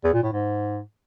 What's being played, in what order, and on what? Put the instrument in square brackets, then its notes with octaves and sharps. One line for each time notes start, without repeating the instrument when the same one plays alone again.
[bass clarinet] E2
A#2
A2
G#2